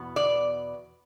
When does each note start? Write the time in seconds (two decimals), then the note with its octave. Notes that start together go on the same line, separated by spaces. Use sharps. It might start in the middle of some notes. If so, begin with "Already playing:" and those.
Already playing: E2 B2 B3
0.16 D5